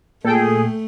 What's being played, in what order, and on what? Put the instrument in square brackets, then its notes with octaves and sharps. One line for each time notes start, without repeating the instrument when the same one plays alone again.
[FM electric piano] A#2 [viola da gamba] A3 [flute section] G#4 [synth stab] A4 G5